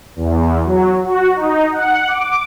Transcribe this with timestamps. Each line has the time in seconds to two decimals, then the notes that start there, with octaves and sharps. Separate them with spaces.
0.16 E2
0.64 F#3
1.04 F#4
1.36 D#4
1.72 F#5
2.08 D6